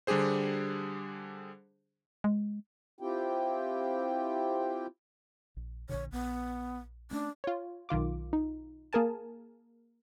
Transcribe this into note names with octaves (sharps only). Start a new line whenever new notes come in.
D3 G3 D4 G4 G#4 C5
G#3
C4 E4 F4 G4 G5
A#1
A#1 A#2 D3 C#5
A#1 B3
A3 C#4 D4
F4 C#5
B1 D#3 F4 D6
D#4
A#3 G#4 A#4 G#5 A5